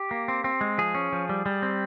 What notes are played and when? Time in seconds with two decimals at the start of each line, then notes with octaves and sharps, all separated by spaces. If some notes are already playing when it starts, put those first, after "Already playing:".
Already playing: G4
0.11 A#3
0.28 C4
0.44 C4
0.61 G#3
0.78 F3 G#4
0.95 C#4
1.13 F3
1.29 G3
1.46 G3
1.62 C4